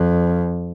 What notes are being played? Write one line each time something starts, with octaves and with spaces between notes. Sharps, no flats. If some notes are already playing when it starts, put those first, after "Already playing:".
Already playing: F2